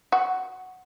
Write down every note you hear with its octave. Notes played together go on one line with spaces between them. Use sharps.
F#4